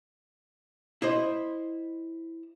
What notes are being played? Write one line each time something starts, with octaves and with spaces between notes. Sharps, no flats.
E4 C5 D#5